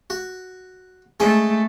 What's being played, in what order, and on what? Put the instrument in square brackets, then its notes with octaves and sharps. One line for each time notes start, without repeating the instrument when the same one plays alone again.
[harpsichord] F#4
[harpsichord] G#3 C#4 D#5 [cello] A3